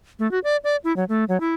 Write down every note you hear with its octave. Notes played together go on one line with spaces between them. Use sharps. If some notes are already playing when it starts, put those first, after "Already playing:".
A3
F#4
D5
D5
E4
F#3
A3
F#3
E4